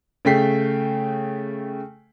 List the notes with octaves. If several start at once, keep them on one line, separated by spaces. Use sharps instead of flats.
C#3 A3 G5 B6 C7